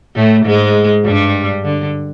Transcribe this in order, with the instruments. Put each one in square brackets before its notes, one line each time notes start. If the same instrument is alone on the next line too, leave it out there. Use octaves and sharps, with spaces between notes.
[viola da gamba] A2 A3
G#2 G#3
G2 G3
D3